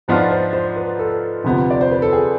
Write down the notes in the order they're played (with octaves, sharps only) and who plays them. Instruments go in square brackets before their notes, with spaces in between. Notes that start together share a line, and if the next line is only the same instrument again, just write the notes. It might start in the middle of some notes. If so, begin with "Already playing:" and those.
[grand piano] G#2 F3 B3 D4 F4 [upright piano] C5
[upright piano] C5
C5
B4
A4
[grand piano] D2 C3 F3 B3
[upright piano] D5
C5
B4
A4
G#4